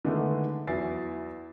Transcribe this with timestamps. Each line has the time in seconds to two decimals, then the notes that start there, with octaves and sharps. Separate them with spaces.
0.05 D3 D#3 G#3 A3 B3
0.67 E2 F#3 E4 G#5 A6 C7